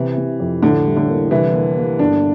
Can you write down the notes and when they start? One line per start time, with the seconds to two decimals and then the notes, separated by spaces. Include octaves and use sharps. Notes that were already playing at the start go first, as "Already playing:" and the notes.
Already playing: C3 E3
0.17 C3
0.40 F2
0.63 A2 D3
0.85 G3
0.97 D3
1.08 A#3
1.31 C2 E3
1.53 A#3
1.77 A#3
1.99 G1 D4